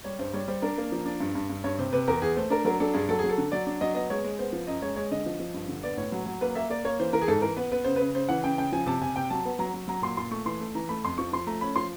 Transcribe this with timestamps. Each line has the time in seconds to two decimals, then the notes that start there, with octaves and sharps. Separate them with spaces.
0.04 G3 C#5
0.19 G2 C5
0.33 G3 C#5
0.48 G3 C5
0.62 D4 A#4
0.78 A#3
0.92 F3
1.06 D4
1.20 G2
1.35 G2
1.49 G2
1.64 G2 C#5
1.79 C3 C5
1.93 C3 B4
2.08 E2 A#4
2.22 E2 G#4
2.36 A3 C5
2.50 D4 A#4
2.65 F#3 A#4
2.80 D4 A4
2.94 G2 G#4
3.08 F#3 A4
3.19 F#3 G#4
3.29 A4
3.38 D3
3.52 F#3 D5
3.67 D4
3.81 F#3 D#5
3.95 B3 D#5
4.10 G#3 C#5
4.24 G#3
4.39 B3 C5
4.53 F3
4.67 F#2 D#5
4.82 G#3 C#5
4.96 G#3 C#5
5.11 D3 D#5
5.26 F3
5.40 F3
5.54 G2
5.68 D3
5.83 B3 D5
5.97 A2 C#5
6.12 F#3
6.26 F#3
6.41 A#3 B4
6.55 A#3 E5
6.70 A#3 D5
6.85 A#3 C#5
7.00 E3 C5
7.13 E3 A#4
7.22 G#4
7.28 G#2 A4
7.42 E3 A#4
7.57 B3 B4
7.72 B3 B4
7.84 C#3 C5
7.96 C#3 B4
8.15 C#3 C5
8.29 E3 F#5
8.44 C#3 G5
8.58 C#3 G5
8.72 F3 G#5
8.86 C3 A5
9.01 C3 G#5
9.16 C3 G5
9.30 F#3 A5
9.45 B3
9.59 F#3 A#5
9.74 F#3
9.88 F#3 A#5
10.02 A#2 C6
10.17 A#2 C6
10.31 A3 C#6
10.45 E3 C6
10.60 A3
10.75 E3 A#5
10.89 A3 B5
11.04 F2 C6
11.18 F3 C#6
11.33 F3 C6
11.47 A3 A#5
11.61 C#4 B5
11.76 F3 C6